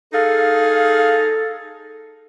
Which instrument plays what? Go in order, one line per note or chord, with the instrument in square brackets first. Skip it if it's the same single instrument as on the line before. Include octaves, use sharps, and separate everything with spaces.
[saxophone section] D#4 G#4 F5 [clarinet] A4